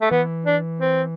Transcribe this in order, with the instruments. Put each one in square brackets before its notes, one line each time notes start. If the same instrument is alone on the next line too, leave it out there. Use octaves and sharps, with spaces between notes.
[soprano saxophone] A3
[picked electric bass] E3 [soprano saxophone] B3
[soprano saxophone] D4
C4